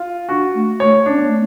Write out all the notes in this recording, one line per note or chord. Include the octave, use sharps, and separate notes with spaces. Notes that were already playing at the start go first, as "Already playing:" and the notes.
Already playing: F4
D4 F#4
A3
A3 C#5
C#4 D4
B3
A3